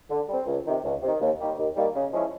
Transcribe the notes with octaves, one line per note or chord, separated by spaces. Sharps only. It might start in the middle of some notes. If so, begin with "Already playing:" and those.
D3
G3 C4
C#2
C3 D#3
C#2
C3 D#3
D#2
D#3 G3 A#3
D#2
D#3 G3 A#3
C#3
F3 G#3 C#4 E4